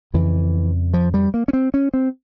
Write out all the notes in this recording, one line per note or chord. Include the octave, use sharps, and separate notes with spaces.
F2 C#3 E3
F3
G3
A#3
C#4
C4
C#4
C4